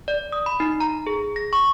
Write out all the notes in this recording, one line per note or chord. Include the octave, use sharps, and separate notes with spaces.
D5
D#6
B5
D#4
A#5
G#4
A#6
C#6